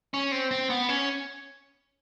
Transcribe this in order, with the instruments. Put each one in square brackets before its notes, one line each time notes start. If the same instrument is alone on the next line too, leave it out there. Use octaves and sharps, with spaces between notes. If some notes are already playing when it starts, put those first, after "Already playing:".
[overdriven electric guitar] C#4
C4
C4
B3
C#4